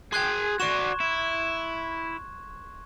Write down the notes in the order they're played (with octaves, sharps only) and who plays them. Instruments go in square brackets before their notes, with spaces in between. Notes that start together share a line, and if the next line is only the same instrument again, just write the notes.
[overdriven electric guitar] G#4 G5 [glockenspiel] C6 F#6 G#6
[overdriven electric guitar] F#4 D5 [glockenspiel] C#6 E7
[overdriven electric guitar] E4